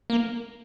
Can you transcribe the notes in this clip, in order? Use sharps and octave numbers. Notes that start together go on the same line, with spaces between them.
A#3